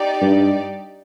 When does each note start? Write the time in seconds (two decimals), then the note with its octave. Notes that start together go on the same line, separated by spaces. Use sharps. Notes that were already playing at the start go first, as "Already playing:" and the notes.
Already playing: D#4 G4 D5
0.21 G2